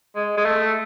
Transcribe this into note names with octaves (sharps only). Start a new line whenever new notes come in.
G#3
G#3
A3